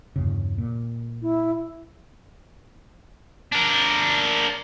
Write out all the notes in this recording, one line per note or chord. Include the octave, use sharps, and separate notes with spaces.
E2 G2 C#3
A#2
E4
D4 A#4